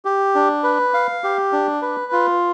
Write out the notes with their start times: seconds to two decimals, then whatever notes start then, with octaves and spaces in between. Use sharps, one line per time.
0.05 G4
0.35 D4
0.64 B4
0.94 F5
1.24 G4
1.53 D4
1.82 B4
2.12 F4